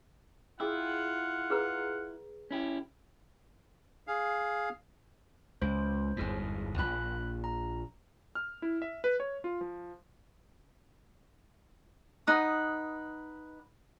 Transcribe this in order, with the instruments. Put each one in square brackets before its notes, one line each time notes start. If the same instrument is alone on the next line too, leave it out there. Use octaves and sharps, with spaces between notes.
[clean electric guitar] E4 [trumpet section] F4 F#5 [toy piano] G#4 G5 E6
[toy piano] G#4 B4 A#5
[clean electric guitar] C#4 E4 G4
[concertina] G#4 F5
[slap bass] C#2 [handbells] C5
[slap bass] G1 E2 G#2
[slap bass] A#1 F3 [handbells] B5 F#6
[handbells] A#5
[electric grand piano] F6
E4
E5
B4
C#5
F4
F3
[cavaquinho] D#4 B4 F#5 D#6